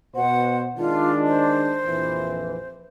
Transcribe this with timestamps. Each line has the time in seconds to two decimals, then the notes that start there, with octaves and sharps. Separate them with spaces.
0.16 B2 C5 F#5
0.77 D#3 G#3 D4 F4
1.26 C5
1.85 A#1 F2 E3